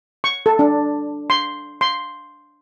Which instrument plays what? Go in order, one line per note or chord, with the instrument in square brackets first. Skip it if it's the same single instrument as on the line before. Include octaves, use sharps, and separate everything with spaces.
[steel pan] C#6
A4
D4
C6
C6